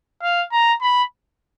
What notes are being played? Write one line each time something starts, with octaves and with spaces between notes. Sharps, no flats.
F5
A#5
B5